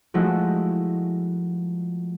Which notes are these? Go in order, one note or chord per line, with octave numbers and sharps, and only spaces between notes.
F3 G#3 A3 E4 F#4